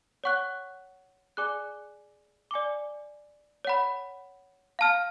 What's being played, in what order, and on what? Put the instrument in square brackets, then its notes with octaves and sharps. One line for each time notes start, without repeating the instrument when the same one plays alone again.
[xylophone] C#5 F#5 C#6 F#6
G#4 D5 G#5 D6 F#6
D5 G#5 D6
C#5 F#5 B5
F5 A5 F6